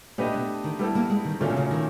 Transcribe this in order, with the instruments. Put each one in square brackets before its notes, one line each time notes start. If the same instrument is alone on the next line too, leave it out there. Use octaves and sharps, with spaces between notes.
[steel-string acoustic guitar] A#2 [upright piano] A3 D4 G4 B4 D#5
[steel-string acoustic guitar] B2
D#3
[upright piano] G3 B3 E4 A4 [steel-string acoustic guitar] A3
[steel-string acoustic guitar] A#3
G#3
D#3
[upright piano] A#2 F#3 A3 C#4 F4 [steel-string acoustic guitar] D3
[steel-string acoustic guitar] C3
C#3
D#3